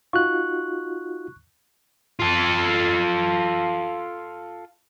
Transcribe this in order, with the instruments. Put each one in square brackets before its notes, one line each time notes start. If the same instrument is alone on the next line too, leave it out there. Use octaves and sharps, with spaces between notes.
[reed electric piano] D#4 F4 F#4 [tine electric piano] C#6 F#6
[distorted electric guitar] F4 A4